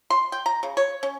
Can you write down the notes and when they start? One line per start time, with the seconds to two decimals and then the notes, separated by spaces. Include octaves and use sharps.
0.10 C6
0.32 G5
0.46 A#5
0.63 C#3
0.77 C#5
1.03 C#4